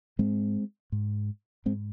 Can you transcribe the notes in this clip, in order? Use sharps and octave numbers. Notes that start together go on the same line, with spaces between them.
G#2 G#3 C4
G#2
G#2 G#3 C4